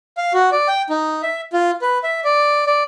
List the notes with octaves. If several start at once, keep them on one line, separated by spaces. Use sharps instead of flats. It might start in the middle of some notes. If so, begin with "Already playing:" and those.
F5
F#4
D5
G5
D#4
E5
F4
B4
E5
D5
D5